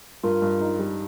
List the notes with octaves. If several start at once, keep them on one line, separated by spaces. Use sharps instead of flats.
G2 F4 A#4
G2
D#4
G3